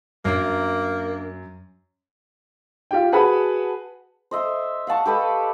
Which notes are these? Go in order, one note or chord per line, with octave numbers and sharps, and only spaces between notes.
F#2 F#3 A#3 D4 E5
F4 G4 G5
F#4 G#4 B4 F#5 A5 B5
C5 D#5 E5 C6
F5 F#5 A5 C#6
G4 A4 B4 D#5